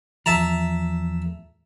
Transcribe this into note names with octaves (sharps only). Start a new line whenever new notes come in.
E2 F3 E5 A5 A#5